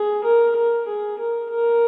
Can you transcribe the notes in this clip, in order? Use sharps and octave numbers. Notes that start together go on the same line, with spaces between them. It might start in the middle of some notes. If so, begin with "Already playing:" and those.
Already playing: G#4
A#4
A#4
G#4
A#4
A#4